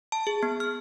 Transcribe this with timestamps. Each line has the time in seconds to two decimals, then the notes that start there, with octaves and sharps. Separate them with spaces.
0.12 A5
0.27 G#4
0.43 B3
0.60 F6